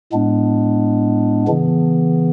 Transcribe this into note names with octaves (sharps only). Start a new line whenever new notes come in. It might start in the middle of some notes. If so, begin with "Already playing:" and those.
A2 G#3 B3 D4
C#3 E3 B3